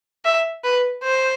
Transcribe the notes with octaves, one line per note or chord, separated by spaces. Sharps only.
E5
B4
C5